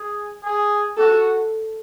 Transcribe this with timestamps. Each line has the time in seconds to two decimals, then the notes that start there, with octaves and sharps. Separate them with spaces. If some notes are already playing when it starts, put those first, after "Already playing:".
Already playing: G#4
0.43 G#4
0.97 F#4 A4